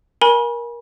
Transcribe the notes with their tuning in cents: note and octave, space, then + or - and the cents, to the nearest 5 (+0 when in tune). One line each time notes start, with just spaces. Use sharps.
A#4 +20 G#5 +0 B5 -40